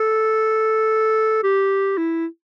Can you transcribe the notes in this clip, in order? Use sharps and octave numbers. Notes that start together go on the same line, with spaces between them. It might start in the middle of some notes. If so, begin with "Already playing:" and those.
Already playing: A4
G4
E4